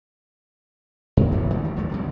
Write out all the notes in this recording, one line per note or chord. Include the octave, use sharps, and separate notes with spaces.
G2 B2
D2 E3 A3 A#3
D3 A3 B3 C4
D#3 G3
A#1 D#2 F3 A3
B2 D3 G3